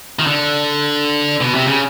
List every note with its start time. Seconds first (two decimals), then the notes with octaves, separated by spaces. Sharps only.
0.19 D#3
0.26 D3
1.40 B2
1.54 C3
1.67 C#3